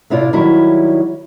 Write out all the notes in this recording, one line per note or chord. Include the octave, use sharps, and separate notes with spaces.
A2 C3 E4 F4 D5
D#3 F#3 G3 E4